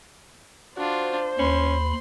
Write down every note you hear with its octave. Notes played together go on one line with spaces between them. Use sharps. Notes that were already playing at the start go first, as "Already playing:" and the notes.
D4 F4 F#4 C5
D#2 C#4 B5 C6